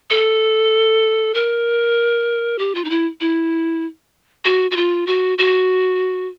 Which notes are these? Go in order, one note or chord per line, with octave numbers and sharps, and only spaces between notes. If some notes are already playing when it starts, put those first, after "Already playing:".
A4
A#4
G4
F4
D#4
E4
E4
F#4
F#4
F4
F#4
F#4